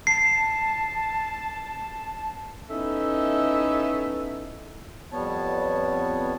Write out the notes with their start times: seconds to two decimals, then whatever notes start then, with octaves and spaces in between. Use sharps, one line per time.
0.07 A5 C7
2.70 B3 C#4 D#4 E4 A4 E5
5.12 F2 G3 B3 C#5 A5